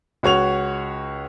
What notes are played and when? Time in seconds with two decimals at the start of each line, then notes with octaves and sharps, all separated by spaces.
0.23 C#2 F#4 C#5 F7